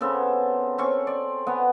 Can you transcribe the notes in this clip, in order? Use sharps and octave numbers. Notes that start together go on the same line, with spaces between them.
C#3 B3 C4 A4
C4 C#4 C#6
D5
B3 F#5 G#5